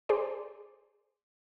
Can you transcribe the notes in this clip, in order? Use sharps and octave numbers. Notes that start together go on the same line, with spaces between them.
G#4 C5 D5